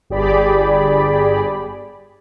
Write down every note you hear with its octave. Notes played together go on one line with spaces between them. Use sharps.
G1 G4 G#4 D5 B5